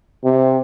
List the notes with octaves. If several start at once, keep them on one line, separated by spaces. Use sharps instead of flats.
C3